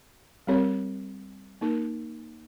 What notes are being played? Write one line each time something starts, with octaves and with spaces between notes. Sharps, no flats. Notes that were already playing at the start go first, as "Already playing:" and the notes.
G3 C4 G4 A#4 C#5
A#3 D#4 A#4